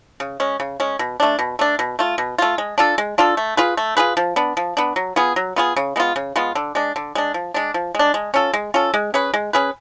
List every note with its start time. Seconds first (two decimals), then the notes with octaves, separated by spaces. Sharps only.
0.20 C#3
0.40 G#3 C#4
0.60 C#3
0.80 G#3 C#4
0.99 B2
1.20 A3 D4
1.39 B2
1.59 A3 D4
1.79 B2
1.99 A3 F4
2.18 B2
2.38 A3 F4
2.58 G#3
2.78 D4 F4 A4
2.98 G#3
3.18 D4 F4 A4
3.37 A3
3.57 F4 G#4 B4
3.77 A3
3.97 F4 G#4 B4
4.17 F3
4.36 B3 D4
4.57 F3
4.77 B3 D4
4.96 F#3
5.16 B3 F4 G#4
5.36 F#3
5.56 B3 F4 G#4
5.76 C#3
5.96 G#3 B3 F4
6.16 C#3
6.36 G#3 B3 F4
6.55 D3
6.75 G#3 D4
6.96 D3
7.15 G#3 D4
7.34 F3
7.54 G#3 D4
7.74 F3
7.95 G#3 D4
8.14 G#3
8.34 C#4 F4 A4
8.54 G#3
8.74 C#4 F4 A4
8.94 G#3
9.14 C#4 G#4 B4
9.34 G#3
9.53 C#4 G#4 B4